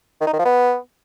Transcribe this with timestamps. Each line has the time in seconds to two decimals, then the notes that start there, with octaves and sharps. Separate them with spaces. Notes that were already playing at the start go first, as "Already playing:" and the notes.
0.21 D#3
0.27 D#4
0.33 D#3
0.39 F3
0.45 B3